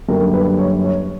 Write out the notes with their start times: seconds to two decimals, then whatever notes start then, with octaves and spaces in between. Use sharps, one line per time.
0.08 F#2 D3 G3 A#3 A#4
0.34 B4
0.59 C#5
0.84 C#5